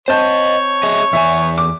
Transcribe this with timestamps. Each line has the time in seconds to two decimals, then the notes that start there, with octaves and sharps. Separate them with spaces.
0.08 C4 C5 C#5 D#5 A5 G6
0.83 G#4 D#5 E5
1.13 E2 E4 E5 G#5
1.58 D6